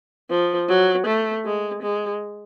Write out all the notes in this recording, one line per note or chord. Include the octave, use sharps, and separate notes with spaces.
F3
F#3
A3
G#3
G#3